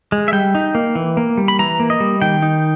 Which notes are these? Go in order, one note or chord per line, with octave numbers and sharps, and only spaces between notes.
G#3
E5
G3 G5
D#4
A#3
E3
A#3
G3
B5
E3 A#5
A#3
D#5
G3
D#3 G5
D#4